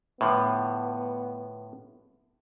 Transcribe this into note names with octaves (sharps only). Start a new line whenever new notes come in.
A2 D3 F3 B3